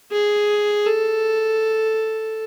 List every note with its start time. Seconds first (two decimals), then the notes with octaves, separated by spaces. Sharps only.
0.12 G#4
0.86 A4